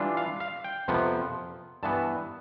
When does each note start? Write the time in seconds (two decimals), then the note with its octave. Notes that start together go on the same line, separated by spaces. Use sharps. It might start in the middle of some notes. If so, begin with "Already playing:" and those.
Already playing: E3 G3 D4 F4
0.17 F5
0.40 F5
0.64 G5
0.88 F2 C3 F3 B3
1.83 G2 E3 B3 A5